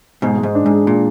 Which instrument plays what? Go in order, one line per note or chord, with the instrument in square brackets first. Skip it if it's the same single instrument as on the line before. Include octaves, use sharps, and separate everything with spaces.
[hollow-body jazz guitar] G#2 B2 [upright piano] G#3
[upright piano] G#3
[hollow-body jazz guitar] G#2
[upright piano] D4
[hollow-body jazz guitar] G#2 [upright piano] G#4
[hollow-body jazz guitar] A#2 [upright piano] G#3